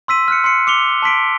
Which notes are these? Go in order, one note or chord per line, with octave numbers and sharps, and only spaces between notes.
C6 E6 B6 D#7
F6 F#6 C#7
C6 C7 C#7
D6 C#7 F7 G7
A5 C6 B6 D7